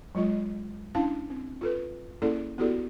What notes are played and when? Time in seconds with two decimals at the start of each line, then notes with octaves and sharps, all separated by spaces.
0.15 F#3 G#3 F4 D#5
0.95 C#4 D4 E4 F5 A5
1.30 C4
1.61 F4 A4 B4
2.22 A#3 C#4 E4 G#4 A4 D5
2.58 B3 E4 F#4 G4 A4 D5